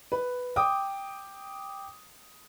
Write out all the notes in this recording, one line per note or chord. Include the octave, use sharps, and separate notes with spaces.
B4
G5 D6 D#6